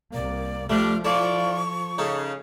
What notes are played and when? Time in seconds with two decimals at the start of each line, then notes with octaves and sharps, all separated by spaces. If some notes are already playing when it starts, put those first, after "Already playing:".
0.14 C2 A#3 D5
0.70 F3 G3 A3 D4 D5 F6
1.05 E4 F4 A4 D5 C#6
1.98 C#3 D#4 A4